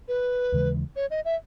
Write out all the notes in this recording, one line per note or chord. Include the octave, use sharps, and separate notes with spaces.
B4
D#2 C#3 E3 G#3
C#5
D#5
E5